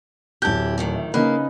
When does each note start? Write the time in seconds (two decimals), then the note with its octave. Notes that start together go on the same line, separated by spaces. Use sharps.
0.42 D1 E4 G4 A5 G6
0.78 F2 A2 D#3
0.96 E5
1.14 C#3 A#3 D#4 B4